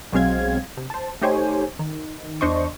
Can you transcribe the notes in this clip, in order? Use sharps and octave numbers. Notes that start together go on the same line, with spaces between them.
B1 F#3 G#3 C4 F5 G#6
C3
C5 A5
A3 D#4 G4 C5 C#5 G#5
D#3
E2 D4 C5 D#5 C6 C#6